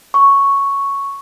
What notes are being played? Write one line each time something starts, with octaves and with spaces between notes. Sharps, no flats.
C#6